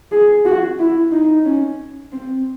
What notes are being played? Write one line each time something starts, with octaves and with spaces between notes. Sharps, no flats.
G#4
F#4
E4
D#4
C#4
C4